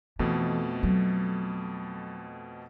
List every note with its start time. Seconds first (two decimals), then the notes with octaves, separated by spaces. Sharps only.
0.19 F2 B2 E3 A3
0.83 F#3